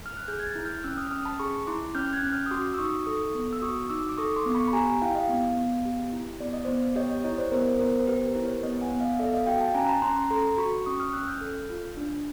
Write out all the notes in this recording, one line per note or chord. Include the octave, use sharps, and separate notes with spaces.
F6
F#6
G#4 F6 G6
G#6
G6 A6
E4
F6 G6
C#4 E6 F#6
D#6 F6
C#4 D#6 F6
A5 B5
G#4 B5 C#6
E4 C6 D6
C#4 F6 G6
F#6 G#6
C#4
F6 G6
D#6
F#4 C6 D6
E6
D#4 C#6 D#6
A4 C#6 D#6
B3
E6
F#4 C#6 D#6
D#4 D6 E6
D6
A4 C#6 D#6
C6 D6
B3
B5 C#6
B5
G4 G#5 A#5
E4 F5 G5
D#5 F5
B3
B3
G4
E4
B3 D5
D#5
B3 C5 D5
G4 C#5 D#5
C#5 D#5
E4 C#5 D#5
C5 D5
B3 A#4 C5
B3 A#4 C5
C5
G4 B4
A#4 C5
E4
B4 C#5
B3 C#5 D#5
F#5 G#5
B3
D#5 F5
A4 D5 E5
D#5 F5
F#4 F5 G5
G5 A5
C#4 G#5 A#5
A#5
A5 B5
C#4 A#5 C6
A#5 C6
A4 A#5 C6
F#4 B5 C#6
C#4 C#6 D#6
D#6 F6
C#4 E6 F#6
F6 G6
A4
F4
D4